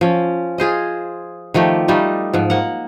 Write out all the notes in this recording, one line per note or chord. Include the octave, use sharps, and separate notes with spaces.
F3 C#4
F4 G#4 C5 D#5
D#3 F3 A3 G4
G3 A3 D#4 F4
G#2 F3
A#3 F#5